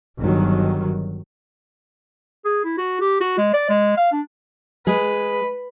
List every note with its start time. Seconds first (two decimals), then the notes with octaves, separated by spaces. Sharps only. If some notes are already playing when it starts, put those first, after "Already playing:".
0.18 G1 D#3 F#3
2.45 G#4
2.65 E4
2.78 F#4
3.01 G4
3.21 F#4
3.38 G#3
3.54 D5
3.70 G#3
3.97 F5
4.12 D4
4.87 G#3 G#4 B4